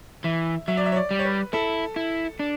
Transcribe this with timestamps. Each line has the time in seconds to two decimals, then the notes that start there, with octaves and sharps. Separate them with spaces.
0.24 E3 E5
0.68 F#3 E5
0.77 D5
0.86 E5
0.92 C#5
0.96 D5
1.11 G3
1.19 C#5
1.25 B4
1.53 E4 A4
1.96 E4
2.39 D4